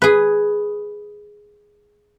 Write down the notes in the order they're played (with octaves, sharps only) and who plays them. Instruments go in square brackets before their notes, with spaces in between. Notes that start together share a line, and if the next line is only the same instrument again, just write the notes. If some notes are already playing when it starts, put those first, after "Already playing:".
[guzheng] G#4 B4